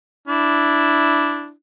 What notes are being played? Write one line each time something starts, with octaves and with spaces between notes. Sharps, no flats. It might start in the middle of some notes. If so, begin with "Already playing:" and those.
D4 E4